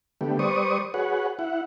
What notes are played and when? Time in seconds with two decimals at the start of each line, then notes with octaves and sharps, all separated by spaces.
0.21 D3 A3 B3 G4
0.39 G3 B4 C5 D5 C#6 D#6
0.94 F#4 G#4 B4 C#5 F#5
1.39 E4 F#5